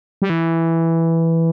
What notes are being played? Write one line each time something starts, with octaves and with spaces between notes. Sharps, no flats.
G3
E3